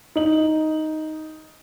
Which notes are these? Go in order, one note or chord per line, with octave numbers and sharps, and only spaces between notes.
D#4 F#7